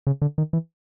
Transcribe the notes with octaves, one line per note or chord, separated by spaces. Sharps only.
C#3
D3
D#3
E3